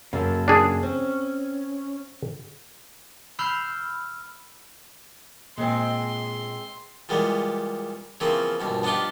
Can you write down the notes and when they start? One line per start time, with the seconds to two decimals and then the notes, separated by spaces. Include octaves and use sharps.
0.13 F#2 C#3 A#3 A4
0.48 D4 G#4
0.83 C4 C#4
3.39 B5 E6 F6 G6 C7
5.58 A#2 G#3 C4 C6
7.09 E2 A#2 G3 G#3 B3
8.20 C#3 E3 F3 A#3 C4
8.60 A#1 G2 B2
8.83 B3 D4 D#4 F4 G4